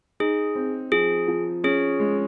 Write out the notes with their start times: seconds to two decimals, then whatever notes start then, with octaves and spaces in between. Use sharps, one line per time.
0.20 D#4 G#4
0.55 C4
0.92 F3 G#4
1.28 F3
1.64 C#4 G#4
2.00 G#3